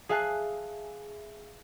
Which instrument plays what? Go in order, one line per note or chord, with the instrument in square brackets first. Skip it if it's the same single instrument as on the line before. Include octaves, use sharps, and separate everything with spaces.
[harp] G#4 E5 F5 G#5 A5 F#6